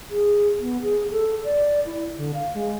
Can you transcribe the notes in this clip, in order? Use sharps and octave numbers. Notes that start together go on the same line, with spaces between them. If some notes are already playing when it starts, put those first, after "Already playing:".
G#4
B3
G#4
A4
D5
E4
D3
F5
G#3